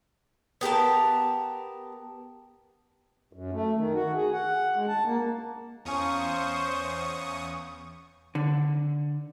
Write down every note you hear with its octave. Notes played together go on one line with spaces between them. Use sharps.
B3 G4 A#4 A5
F#2
A3
D#3
F#4
G#4
F#5
G#3
A5
A#3
E2 C#4 C5 F5 A#5 C#6 D#6
D3